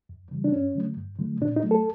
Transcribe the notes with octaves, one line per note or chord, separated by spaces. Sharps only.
F2
C#3 E3 G3
D4
G2 C#4
D3 F#3 A3
G2
D3 F#3 A3
A#2 D4
D#4
F#3 A3
A4